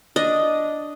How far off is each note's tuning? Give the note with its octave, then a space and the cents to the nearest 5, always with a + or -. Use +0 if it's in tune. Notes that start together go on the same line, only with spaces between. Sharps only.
D4 +0 D#5 +0